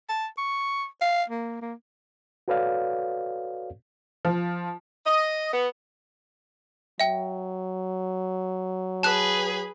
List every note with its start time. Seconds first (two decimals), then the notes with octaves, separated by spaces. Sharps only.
0.09 A5
0.38 C#6
1.01 F5
1.30 A#3
1.62 A#3
2.48 F#4 A4 B4 C#5 D5 F5
4.25 F3
5.06 D#5
5.52 B3
7.00 F#3 E5 G5
9.03 G#4 B4 A5 F#6